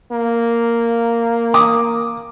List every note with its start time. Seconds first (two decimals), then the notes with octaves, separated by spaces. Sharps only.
0.11 A#3
1.54 D6 D#6